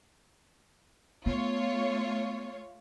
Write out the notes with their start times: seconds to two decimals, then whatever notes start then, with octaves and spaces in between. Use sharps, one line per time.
1.26 A3 B3 F4 C#5